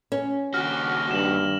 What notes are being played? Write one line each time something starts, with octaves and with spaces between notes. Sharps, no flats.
C#4
D#2 F#4 F6 A#6
G2 E7 F#7